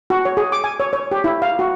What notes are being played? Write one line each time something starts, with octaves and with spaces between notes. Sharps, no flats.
F#4
C#5
G#4
D6
G#5
C#5
C#5
G4
E4
F5
F#4